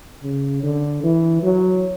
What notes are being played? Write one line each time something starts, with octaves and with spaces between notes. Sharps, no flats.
C#3
D3
E3
F#3